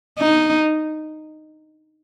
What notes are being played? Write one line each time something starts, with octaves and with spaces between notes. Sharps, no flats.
D#4